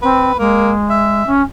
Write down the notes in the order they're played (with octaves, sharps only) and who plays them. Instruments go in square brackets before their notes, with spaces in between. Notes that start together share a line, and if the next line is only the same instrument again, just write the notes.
[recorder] C4 [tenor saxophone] B4
[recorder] G#3 [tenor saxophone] A#3
[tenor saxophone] E5
[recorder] C#4